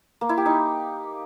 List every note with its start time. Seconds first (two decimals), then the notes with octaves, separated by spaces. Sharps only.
0.21 A#3
0.29 E4
0.37 G4
0.46 D#4